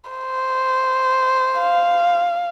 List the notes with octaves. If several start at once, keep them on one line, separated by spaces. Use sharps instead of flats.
C5
F5